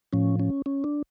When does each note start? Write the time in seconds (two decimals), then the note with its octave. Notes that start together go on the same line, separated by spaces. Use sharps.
0.13 A2 F3 C#4
0.40 C#4
0.66 C#4
0.84 D4